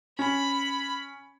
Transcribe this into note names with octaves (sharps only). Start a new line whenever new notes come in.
C#4 B5